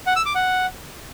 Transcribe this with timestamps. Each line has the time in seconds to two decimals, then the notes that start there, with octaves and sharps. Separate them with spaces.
0.06 F#5
0.16 E6
0.26 D6
0.35 F#5